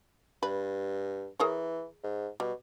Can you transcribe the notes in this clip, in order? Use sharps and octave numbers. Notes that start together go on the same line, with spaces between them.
G2 B4
E3 G#4 A#4 C#5
G#2
B2 G3